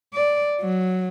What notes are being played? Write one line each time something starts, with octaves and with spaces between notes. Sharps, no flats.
D5
F#3